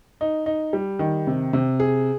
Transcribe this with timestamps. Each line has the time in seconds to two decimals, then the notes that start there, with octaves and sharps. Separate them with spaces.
0.21 D#4
0.46 D#4
0.73 G3
0.99 D#3
1.27 C3
1.53 C3
1.80 G#4